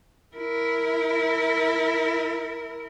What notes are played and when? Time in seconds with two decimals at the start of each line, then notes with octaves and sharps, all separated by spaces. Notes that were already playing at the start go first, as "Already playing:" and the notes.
0.36 E4 A#4